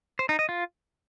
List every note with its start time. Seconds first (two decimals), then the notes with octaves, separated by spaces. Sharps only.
0.19 C5
0.29 D#4
0.39 D#5
0.49 F4